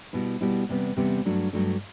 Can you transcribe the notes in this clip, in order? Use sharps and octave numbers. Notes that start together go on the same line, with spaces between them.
B2 G3 B3 E4
B2 G3 B3 E4
E2 C3 G3 B3
E2 C3 G3 B3
G2 F#3 A3 D4
G2 F#3 A3 D4